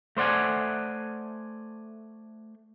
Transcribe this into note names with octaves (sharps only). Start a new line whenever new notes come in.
A3 C5 D5 F#5 G#5